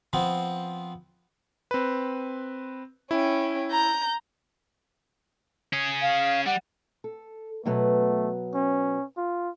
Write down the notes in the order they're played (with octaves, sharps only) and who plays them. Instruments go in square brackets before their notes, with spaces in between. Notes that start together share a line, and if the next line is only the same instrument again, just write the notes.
[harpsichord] F3 B3 C4
[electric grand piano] C4 B4
[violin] C#4 G5 [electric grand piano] E4
[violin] A#5 G6
[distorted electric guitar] C#4 G#4
[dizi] F5
[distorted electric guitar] G3 [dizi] F#5
[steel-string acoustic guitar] A4
[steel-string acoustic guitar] B2 F#3 B3 [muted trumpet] A3
[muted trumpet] C#4
F4